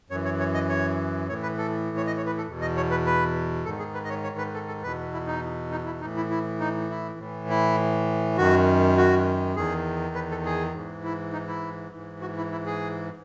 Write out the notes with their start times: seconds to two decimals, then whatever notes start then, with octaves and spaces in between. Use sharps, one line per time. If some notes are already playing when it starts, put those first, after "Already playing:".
0.10 F#2 C#5
0.13 E3
0.25 C#5
0.39 C#5
0.54 D#5
0.69 C#5
1.29 A2 E3 C#5
1.43 B4
1.58 A4
1.97 C#5
2.07 D#5
2.17 C#5
2.26 B4
2.37 A4
2.47 E2 B2
2.62 D#5
2.77 C#5
2.91 B4
3.06 B4
3.65 G#2 D#3 A4
3.79 G#4
3.94 B4
4.04 D#5
4.09 C#5
4.23 C#5
4.38 B4
4.54 A4
4.68 A4
4.82 E2 B2 B4
5.13 E4
5.27 D#4
5.71 D#4
5.86 E4
6.01 A2 E3 D#4
6.17 E4
6.30 E4
6.60 D#4
6.90 E4
7.19 A2 E3
7.49 E4
8.37 F#2 D#3 F#4
8.97 F#4
9.56 E2 D#3 G#4
10.15 B4
10.30 A4
10.45 G#4
10.74 G#2 E3
11.04 E4
11.33 D#4
11.48 E4
11.92 G#2 E3
12.21 F#4
12.37 E4
12.52 E4
12.66 G#4